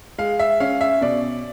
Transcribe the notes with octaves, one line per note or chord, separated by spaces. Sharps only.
G#3 F5
E5
C#4 F5
E5
B2 D5